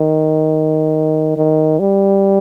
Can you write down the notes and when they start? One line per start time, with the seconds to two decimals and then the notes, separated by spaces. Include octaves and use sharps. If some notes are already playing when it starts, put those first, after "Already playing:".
Already playing: D#3
1.37 D#3
1.79 G3